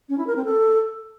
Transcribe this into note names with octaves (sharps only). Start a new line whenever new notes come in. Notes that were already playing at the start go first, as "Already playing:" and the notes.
C#4
E4
A#4
C4
A4